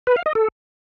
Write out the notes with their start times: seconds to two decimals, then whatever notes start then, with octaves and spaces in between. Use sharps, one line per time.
0.07 B4
0.16 F5
0.26 D#5
0.35 A4